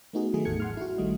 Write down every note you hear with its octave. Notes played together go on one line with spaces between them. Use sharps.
A3 B3 D#4 F#4 G#4
D#3 F#3 A3 E4 G#4
G#1 E2 A2 A4 G#6 C#7
F#5 C6 F6
E4 F#4
A1 D#3 G3 A3 D#5